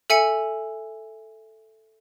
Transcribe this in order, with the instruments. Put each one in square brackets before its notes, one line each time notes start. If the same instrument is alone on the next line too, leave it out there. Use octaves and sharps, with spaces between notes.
[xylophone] A4 E5 G#5 C#7